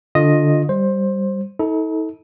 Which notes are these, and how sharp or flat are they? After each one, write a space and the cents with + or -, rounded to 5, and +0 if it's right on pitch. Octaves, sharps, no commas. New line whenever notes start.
D3 +0 F4 +20 D#5 +0
G3 +0 C5 +15
D#4 +45 A4 +0